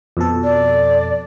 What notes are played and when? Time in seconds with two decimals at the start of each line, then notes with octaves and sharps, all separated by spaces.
0.17 F2 B2 A4
0.44 D5